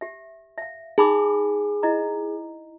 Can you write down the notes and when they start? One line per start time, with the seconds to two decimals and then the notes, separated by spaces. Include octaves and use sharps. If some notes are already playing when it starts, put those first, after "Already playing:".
0.01 G4 E5
0.58 E5 F5
0.98 D#4 G#4 B5 D6
1.83 E4 D#5 A#5